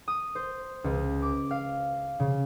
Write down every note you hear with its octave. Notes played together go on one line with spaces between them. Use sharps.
D#6
C5
C#2
D6
F5
C#3